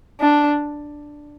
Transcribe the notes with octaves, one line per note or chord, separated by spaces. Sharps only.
D4